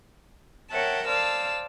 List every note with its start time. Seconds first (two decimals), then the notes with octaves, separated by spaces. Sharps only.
0.70 A#4 C#5 E5 F#5 G5 A5
1.07 C5 D5 F5 A5 E6